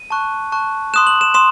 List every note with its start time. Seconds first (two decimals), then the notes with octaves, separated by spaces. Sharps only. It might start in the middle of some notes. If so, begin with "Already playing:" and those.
Already playing: D#7
0.10 A5 C#6 F#6
0.52 A5 C#6 F#6
0.94 C6 D#6 F#6 E7
1.07 F#7
1.21 E7
1.34 C6 D#6 E7